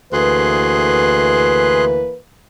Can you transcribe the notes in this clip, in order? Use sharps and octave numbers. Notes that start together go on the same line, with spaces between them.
D2 E3 A#3 G#4 B4 C6 F#6